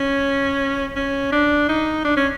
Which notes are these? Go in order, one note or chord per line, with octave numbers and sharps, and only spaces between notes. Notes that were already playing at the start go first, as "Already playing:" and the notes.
Already playing: C#4
C#4
D4
D#4
D4
C#4